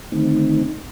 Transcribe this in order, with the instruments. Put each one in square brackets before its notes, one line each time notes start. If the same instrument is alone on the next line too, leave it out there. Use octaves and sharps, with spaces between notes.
[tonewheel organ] D3 D#3 A3 C4 D#4